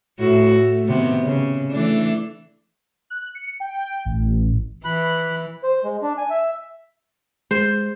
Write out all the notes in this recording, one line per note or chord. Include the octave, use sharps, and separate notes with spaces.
A2 E4 F#4
A3
C3 D#3 B3
C#3
E3 A3 D4
F#6
C#7
G5
A1
E3 B5 F#6
C5
G#3
D4
G#5
E5
G#3 C5